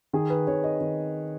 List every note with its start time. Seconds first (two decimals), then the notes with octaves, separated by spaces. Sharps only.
0.13 D#3 G#4
0.30 B4
0.47 D#3 C#5
0.64 D#5
0.81 D#3